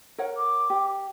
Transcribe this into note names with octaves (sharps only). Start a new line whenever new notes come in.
A#4 C#5 F#5
D6
G4